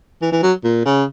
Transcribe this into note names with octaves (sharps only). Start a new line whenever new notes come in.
E3
E3
F#3
A#2
C#3